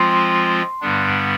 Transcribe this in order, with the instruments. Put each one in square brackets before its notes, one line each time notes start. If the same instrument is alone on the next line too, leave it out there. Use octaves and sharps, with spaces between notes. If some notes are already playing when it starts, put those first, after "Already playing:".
Already playing: [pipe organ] F3 G#3 C4 F4 [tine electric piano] C6
[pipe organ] G2 D3 G3 B3 D4